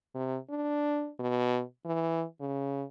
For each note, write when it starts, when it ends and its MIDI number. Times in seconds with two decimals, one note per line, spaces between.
0.15 0.37 48
0.50 1.10 62
1.19 1.62 47
1.86 2.24 52
2.41 2.84 49